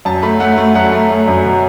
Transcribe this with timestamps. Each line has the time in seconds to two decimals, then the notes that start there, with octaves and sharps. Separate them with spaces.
0.05 F#2 A5
0.23 A3 B5
0.40 A3 F#5
0.58 A3
0.75 F#2 F#5
0.92 A3
1.10 A3
1.28 F#2
1.45 B2